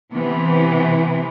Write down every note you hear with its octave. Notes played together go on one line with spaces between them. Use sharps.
C3 E3 B3